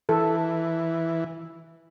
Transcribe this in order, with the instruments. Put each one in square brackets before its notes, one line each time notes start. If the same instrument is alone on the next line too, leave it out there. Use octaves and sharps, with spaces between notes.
[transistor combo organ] E3 [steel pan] A4